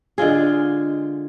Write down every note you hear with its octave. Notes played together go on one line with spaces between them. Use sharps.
D3 G#3 F4 G#4